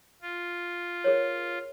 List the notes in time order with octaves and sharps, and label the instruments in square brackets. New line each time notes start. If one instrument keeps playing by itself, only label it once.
[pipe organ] F4
[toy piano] G#4 A#4 C#5